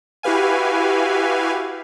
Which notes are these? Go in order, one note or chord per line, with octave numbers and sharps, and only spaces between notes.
E4 F#4 G4 B4 F5 G#5